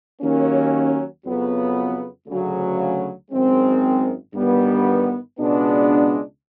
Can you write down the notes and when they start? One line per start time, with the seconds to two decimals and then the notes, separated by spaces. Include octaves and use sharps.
0.21 D#2 D#3 F#3 A#3 C#4
1.24 F2 C#3 F#3 B3
2.27 D2 C#3 F#3
3.31 G#1 F#2 D#3 G#3 C4
4.34 G1 G2 D#3 G3 B3
5.37 C#2 B2 G#3 B3 D4